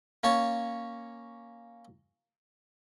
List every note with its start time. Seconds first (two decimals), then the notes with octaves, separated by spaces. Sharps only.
0.24 A#3 C#4 C#5 A5